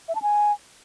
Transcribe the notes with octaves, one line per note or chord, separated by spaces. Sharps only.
E5
A5
G#5